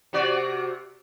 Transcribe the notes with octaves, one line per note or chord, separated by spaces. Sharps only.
C3 F#4 D5